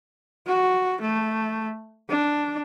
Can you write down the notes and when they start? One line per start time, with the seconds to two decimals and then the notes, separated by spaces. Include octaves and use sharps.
0.47 F#4
1.01 A3
2.09 D4